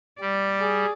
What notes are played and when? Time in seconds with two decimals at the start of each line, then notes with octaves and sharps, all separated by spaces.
0.21 G3 D5
0.61 G#4